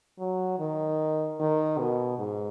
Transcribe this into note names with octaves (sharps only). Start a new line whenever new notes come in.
F#3
D#3
D#3
B2
G#2